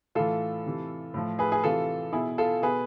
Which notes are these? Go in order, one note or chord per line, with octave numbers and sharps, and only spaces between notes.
A2 E3 F4 A4
C3 E3
A2 F3
G#4 B4
G#4
C3 E3 F4 A4
B2 E4 G#4
F4 A4
B2 G#4 B4